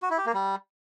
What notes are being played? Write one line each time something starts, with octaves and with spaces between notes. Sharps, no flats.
F#4
E4
G4
A#3
G3